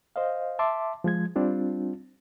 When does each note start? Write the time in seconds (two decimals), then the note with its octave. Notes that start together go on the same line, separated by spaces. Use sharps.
0.16 C5 D#5 F5
0.59 E5 A5 C6 D6
1.04 F3 G#3 G#6
1.36 G3 C4 D4 F4